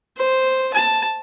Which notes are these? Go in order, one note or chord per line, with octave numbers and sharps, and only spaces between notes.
C5
A5